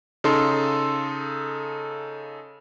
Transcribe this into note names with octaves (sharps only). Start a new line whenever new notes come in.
C#3 D#4 A4 C6